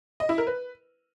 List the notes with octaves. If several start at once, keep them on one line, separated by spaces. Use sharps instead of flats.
D#5
E4
A#4
B4